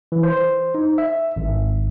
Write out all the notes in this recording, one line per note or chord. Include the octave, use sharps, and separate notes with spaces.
E3
C5
D#4
E5
G#1